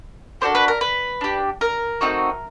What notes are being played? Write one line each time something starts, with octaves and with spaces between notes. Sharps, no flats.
A#3 D4 F#4 A4 C5
B4
A#4
B4
D4 G4
A#4
A3 C4 D#4 F#4